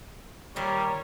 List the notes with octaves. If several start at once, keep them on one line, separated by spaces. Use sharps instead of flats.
A#2 D#3 G3 A#4 C#5